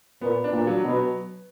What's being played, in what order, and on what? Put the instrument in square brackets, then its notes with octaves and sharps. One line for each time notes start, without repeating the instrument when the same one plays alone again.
[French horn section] A#2 [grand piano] B3
[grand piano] D4
[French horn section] A#2
[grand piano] F#3
[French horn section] B2
[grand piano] B3